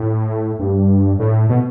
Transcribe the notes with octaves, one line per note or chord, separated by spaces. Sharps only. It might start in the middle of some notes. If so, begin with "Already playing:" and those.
Already playing: A2
G2
A2
B2